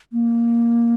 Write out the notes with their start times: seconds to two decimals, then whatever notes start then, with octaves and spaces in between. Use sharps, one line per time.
0.13 A#3